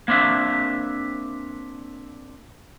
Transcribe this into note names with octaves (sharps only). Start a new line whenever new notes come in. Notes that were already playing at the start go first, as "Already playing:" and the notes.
A#3 C4 D4 E5